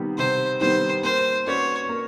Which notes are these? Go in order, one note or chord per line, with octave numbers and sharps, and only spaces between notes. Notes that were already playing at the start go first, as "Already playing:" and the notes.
Already playing: C3 D#3 G3 B3
C3 C5
D#3 G3 B3 C5
A#3 C5
C#4 F#4 B4 C#5 D5
A#3